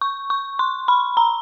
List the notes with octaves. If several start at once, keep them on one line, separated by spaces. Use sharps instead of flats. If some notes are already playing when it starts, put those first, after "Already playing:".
C#6
C#6
C6
B5
A#5